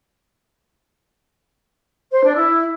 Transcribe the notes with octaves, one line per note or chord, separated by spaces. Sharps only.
C5
D4
E4